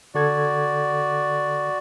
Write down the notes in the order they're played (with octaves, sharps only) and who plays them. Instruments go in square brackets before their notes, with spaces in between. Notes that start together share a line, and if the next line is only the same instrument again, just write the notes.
[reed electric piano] D3 A4 G#6 [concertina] F#4 D5